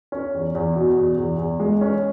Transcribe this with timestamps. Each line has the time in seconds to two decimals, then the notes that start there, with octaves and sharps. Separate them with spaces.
0.12 C#4
0.34 E2
0.55 E2
0.76 B2
0.97 E2
1.17 E2
1.38 E2
1.60 G#3
1.81 C#4